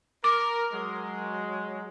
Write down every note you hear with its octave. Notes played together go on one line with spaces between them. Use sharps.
A#4 D6
F#3 G#3